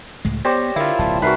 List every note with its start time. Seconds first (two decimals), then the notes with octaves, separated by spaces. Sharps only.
0.25 C#2 A2 G#3
0.45 G3 B3 C5 C#5 A#6
0.76 D3 E4 F4 A#4 F5
0.99 D1 B1 A5
1.22 C2 D#4 F#4 A#4 B4 E5 C7